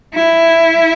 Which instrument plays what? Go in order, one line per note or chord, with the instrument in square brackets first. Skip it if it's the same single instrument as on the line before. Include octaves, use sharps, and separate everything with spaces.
[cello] E4